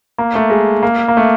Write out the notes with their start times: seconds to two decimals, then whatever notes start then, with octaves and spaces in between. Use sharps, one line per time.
0.18 A#3
0.35 A3
0.50 G#3
0.83 A#3
1.08 A#3
1.17 A3